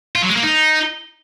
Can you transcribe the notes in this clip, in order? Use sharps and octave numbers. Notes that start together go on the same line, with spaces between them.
F4
F#3
G#3
A#3
D#4